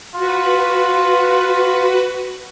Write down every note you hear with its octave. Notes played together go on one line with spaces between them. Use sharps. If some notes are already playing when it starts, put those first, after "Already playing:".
F4 F#4 B4